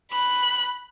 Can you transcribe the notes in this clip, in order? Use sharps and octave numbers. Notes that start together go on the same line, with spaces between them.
B5 F#6